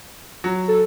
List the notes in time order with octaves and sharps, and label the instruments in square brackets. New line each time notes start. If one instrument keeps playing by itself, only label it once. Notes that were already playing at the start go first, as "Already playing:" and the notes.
[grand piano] F#3
[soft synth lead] A4